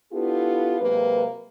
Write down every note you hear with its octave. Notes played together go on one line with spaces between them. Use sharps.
B3 D4 E4 F4 G4 A4
C3 F#3 G#3 A#3 B4